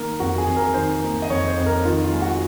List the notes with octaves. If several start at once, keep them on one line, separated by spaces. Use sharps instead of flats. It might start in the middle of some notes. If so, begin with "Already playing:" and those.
Already playing: D#3 A#3 A#4
F2 F#4
G#4
F2
A#4
D#3 C5
A#3
D#5
F2 C#5
C5
F2
A#4
D#3 F4
F4
G#3
F#4